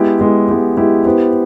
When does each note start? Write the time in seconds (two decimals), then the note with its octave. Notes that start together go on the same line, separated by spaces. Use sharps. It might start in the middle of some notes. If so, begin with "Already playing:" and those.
Already playing: G#3 B3 E4 G4
0.21 G#3 B3 E4 G4
0.49 G#3 B3 E4 G4
0.77 G#3 B3 E4 G4
1.05 B3 E4 G4 C5